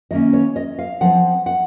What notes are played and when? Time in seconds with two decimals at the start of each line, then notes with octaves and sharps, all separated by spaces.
0.11 D#3 A#3 C#4 D#5
0.33 C#5
0.56 D#5
0.79 F5
1.01 F3 C4 F#5
1.46 F#5